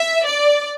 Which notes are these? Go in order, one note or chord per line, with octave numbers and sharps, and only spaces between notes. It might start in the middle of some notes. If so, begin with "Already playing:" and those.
Already playing: E5
D5